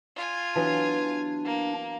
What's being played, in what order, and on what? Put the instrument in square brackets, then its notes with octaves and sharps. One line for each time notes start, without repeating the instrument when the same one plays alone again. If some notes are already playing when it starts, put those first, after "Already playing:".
[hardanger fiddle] F4 G#5
[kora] E3 F#3 B3 [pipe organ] D4
[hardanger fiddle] A#3